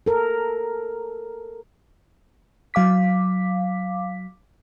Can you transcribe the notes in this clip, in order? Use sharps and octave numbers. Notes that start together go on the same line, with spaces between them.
A4 A#4
F#3 F5 D6 B6